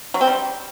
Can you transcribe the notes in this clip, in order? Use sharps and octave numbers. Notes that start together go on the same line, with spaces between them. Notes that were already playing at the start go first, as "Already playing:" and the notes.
F#3
C4
G3